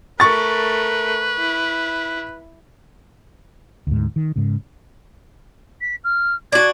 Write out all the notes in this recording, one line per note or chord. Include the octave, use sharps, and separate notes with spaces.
A3 A#4 B4 C#6 A6
E4
D2 G#2
D#3
G#2 C#3
B6
F6
D4 F#4 G#6